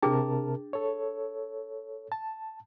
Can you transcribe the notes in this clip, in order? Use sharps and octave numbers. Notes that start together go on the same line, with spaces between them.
C3 D4 G#4 A#4 A5
A4 C#5
A5